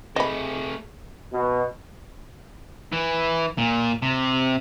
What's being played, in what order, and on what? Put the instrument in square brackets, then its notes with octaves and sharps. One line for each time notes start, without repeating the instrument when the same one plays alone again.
[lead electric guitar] C3 A3 [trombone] G#4 [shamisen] D#5 B5
[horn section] B2
[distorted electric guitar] E3
A#2
C3